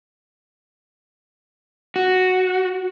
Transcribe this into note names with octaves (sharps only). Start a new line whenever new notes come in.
F#4